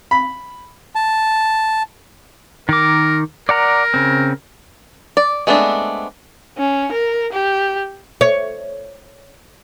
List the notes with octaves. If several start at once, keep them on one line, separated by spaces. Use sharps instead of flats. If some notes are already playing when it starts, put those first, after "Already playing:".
B5
A5
D#3 A#4 D6
A#4 D5 F#5 A#5
C#3 C4
D5
G#3 A3 B3 C4 D4
C#4
A#4
G4
C#5